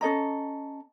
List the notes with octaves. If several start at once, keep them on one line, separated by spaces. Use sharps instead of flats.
C#4 A4 D#5 A#5